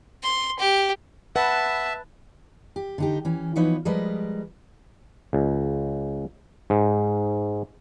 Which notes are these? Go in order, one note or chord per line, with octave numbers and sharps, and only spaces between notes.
C6
G4
B4 E5 F#5 A5
G4
D3 D#4 G4
E3 C#4
E3 F3 B3 D#4 B4 C#5
F3 G3 G#3 A#4 B4 D#5
C#2
G#2